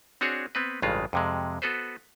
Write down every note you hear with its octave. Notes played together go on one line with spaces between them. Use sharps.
C4 D4 F#4 G#4 C#5
B3 C4 B4
A1 G2 C#3 G#3 F4
F2 C3 G#3
B3 F#4 A4 B4 C5